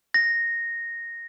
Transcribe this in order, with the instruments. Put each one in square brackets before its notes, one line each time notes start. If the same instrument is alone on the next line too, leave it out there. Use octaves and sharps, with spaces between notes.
[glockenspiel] A#6